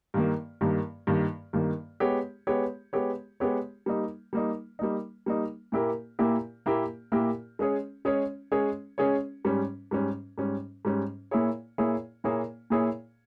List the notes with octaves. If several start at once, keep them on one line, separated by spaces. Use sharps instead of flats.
G2 D#3 A#3
G2 D#3 A#3
G2 D#3 A#3
G2 D#3 A#3
G#3 B3 G4 C#5
G#3 B3 G4 C#5
G#3 B3 G4 C#5
G#3 B3 G4 C#5
G3 A#3 D#4
G3 A#3 D#4
G3 A#3 D#4
G3 A#3 D#4
A#2 A#3 E4 G4 A#4
A#2 A#3 E4 G4 A#4
A#2 A#3 E4 G4 A#4
A#2 A#3 E4 G4 A#4
G#3 C#4 G#4 C#5
G#3 C#4 G#4 C#5
G#3 C#4 G#4 C#5
G#3 C#4 G#4 C#5
G#2 G3 C#4
G#2 G3 C#4
G#2 G3 C#4
G#2 G3 C#4
A#2 A#3 E4 G#4 C#5
A#2 A#3 E4 G#4 C#5
A#2 A#3 E4 G#4 C#5
A#2 A#3 E4 G#4 C#5